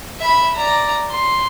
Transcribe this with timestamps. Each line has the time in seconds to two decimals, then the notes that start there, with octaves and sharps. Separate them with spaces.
0.20 E5 B5
0.55 D5 A#5
1.11 C6